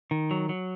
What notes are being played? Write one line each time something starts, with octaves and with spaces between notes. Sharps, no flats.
D#3
F#3
F#3